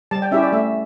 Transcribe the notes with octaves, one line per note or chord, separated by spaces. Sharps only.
G3 A5
G5
C#4 E4 G4 E5
D5
A3 E5